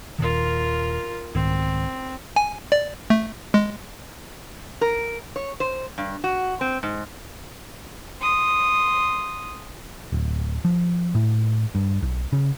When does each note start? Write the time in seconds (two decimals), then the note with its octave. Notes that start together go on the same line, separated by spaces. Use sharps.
0.19 D#1 A#2 D#3 F4 A#4
1.34 C2 G#2 D#3 C4
2.36 G#5
2.72 D5
3.10 A3
3.54 G#3
4.81 A#4
5.36 C#5
5.60 C5
5.98 G2
6.24 F#4
6.61 C4
6.83 G#2
8.21 C6 D#6
10.12 D1
10.65 F3
11.15 A2
11.75 G2
12.03 B1
12.33 C#3